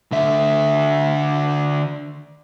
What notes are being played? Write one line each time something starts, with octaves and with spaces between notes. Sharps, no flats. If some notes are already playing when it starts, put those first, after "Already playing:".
D3 E5